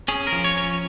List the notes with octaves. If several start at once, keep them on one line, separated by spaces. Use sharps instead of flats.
C#4 G#4
A#4
F3
C#5
C#4